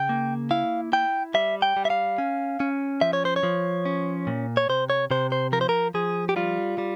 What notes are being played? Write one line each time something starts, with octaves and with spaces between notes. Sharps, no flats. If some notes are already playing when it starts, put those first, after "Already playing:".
Already playing: C#3 G5
A#3
E4 F5
E4 G5
G3 E5
G5
G3
E5
F5
C#4
C#4
F3 E5
C#5
C5
C#5
F3
C#4
A#2
C#5
C3 C5
C#5
C3 C5
C5
F3 A#4
C5
A#4
F3 G#4
G4
G3 F4
G3